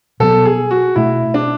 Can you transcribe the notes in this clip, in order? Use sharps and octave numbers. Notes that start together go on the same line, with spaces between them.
B2 F#3 B3 A4
G#4
F#4
B2 A3 D4 E4
D4